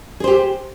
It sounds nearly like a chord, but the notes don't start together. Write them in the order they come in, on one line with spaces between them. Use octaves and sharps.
G#4 C5 G4